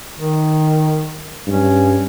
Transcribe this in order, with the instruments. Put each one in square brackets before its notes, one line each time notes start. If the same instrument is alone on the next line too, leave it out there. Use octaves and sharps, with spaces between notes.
[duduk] D#3
[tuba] G2 [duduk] C#4